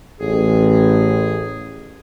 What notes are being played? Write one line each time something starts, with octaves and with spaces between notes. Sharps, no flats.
A1 G#4